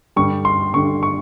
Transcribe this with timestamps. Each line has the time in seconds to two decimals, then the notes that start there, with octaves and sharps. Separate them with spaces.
0.16 G2 D3 G3 C#6
0.45 C6
0.74 G2 D3 G3 C#6
1.03 C#6